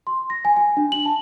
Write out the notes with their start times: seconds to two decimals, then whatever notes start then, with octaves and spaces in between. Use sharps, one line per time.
0.07 C6
0.30 A#6
0.45 G#5
0.56 G#5
0.77 D4
0.92 F#7
1.05 A5